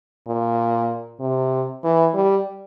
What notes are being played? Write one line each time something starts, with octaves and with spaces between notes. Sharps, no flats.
A#2
C3
E3
G3